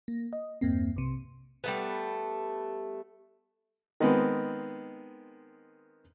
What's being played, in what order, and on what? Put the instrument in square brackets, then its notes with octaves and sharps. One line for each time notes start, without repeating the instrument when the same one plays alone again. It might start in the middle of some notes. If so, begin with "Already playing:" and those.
[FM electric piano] A#3
D#5
E2 G2 A#3 C4
B1 C3
[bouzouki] G3 A3 B3
[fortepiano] D#3 G#3 B3 C4